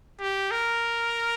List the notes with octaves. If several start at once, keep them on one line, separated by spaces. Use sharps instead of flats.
G4
A#4